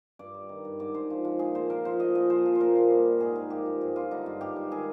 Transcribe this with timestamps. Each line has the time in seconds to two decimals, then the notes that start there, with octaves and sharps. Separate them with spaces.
0.19 G2 D5
0.34 G3
0.49 D#3
0.65 G2
0.79 G#2 D5
0.94 G#2 C5
1.10 F3
1.25 F3
1.39 A#2 G#4
1.55 A#2 C5
1.70 F3 A#4
1.85 F3 C5
2.00 A#2 D#5
2.15 A#2 D#5
2.30 F3 C5
2.46 F3
2.55 C5
2.60 A#2 A#4
2.75 A#2
2.90 G3
3.06 G3
3.20 G#2 G#4
3.36 G#2 A#4
3.50 F3 G4
3.66 F3
3.81 G2 G#4
3.96 G3 F4
4.11 D3 D#4
4.26 G2 F4
4.41 G#2 G4
4.56 G3
4.71 D#3 G#4